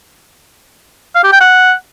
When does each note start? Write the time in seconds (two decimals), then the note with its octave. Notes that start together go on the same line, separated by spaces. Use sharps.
1.16 F5
1.24 G4
1.32 G5
1.41 F#5